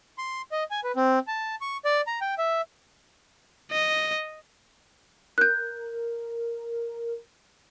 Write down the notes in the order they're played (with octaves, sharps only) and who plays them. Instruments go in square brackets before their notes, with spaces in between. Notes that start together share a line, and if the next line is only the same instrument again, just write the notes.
[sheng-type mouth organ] C6
D#5
G#5
B4
C4
A5
C#6
D5
A#5
G5
E5
[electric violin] D#5
[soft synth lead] A#4 [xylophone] F#6 G6